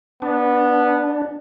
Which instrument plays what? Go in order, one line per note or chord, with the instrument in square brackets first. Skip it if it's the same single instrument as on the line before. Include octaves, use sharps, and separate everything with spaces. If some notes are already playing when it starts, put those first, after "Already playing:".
[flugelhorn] B3 [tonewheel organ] D4